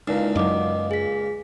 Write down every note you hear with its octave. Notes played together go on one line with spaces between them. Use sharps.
C#2 A#2 D#4 E4
F#2 F#3 D#5 D6
G#4 B6